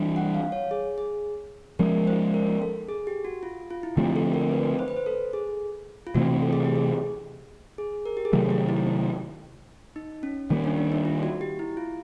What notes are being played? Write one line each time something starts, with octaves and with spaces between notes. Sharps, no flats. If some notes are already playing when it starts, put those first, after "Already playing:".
Already playing: E3 G3 D4
F#5
F5
C#5
G#4
G#4
F3 G#3 C#4 A#4
C5
A#4
A4
G#4
G4
F#4
F4
F4
E4
D3 F3 A3 C4 G4
A4
A#4
B4
C5
B4
C5
A4
G#4
F4
C3 E3 A3 C4 F#4
A4
G#4
G4
G#4
G#4
A#4
G4
G#4
C3 D#3 F#3 A3 A4
G4
E4
D#4
C#4
D#3 G3 A#3 C#4
D4
D4
D#4
F4
F#4
G4
E4
F4